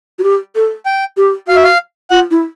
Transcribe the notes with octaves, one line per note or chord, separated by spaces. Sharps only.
F#4
G4
A4
G5
G4
F#4 F5
E5
F5
F4 F#5
E4